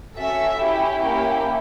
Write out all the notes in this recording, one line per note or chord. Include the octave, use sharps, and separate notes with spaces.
C#4 F#4 A4 E5
C#4 E4 G4
A#3 C#4 E4 G4